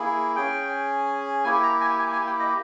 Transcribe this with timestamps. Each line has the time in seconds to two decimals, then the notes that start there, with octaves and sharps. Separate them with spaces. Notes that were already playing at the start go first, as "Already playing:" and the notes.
Already playing: A#3 E4 G#4
0.35 C#4 G#4 G5
1.44 A#3 E4 G4 G#5
1.63 A#5
1.81 G#5
1.99 G#5
2.12 G#5
2.26 G5
2.40 D#5